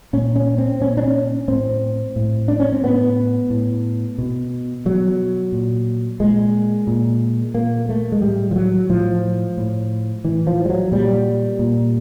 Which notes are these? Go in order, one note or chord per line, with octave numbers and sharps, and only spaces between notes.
A#2 C#4
C#4
C4
A#2 C#4
D4
C#4
A2 C4
A2
D4
C#4
C4
A2 B3
A2
B2
B2 F#3
A#2
A#2 G#3
A#2
A#2 A#3
A3
G#3
A2 G3
F3
F#3
A2 F3
A2
A2 E3
F3
G3
F#3
A#2 G3
A#2